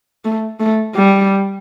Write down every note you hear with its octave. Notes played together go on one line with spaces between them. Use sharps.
A3
A3
G3